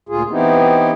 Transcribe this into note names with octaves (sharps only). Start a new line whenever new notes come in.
D2 A#2 F4 G#4
E3 B3 C4 D#4 E4 G4